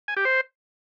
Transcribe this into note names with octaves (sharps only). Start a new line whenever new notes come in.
G#5
G4
C5